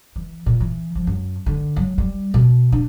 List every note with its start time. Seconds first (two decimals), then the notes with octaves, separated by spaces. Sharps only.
0.16 E3
0.46 A#2
0.60 E3
0.95 F3
1.07 F#2
1.46 D3
1.76 F#3
1.98 G3
2.34 B2
2.72 D4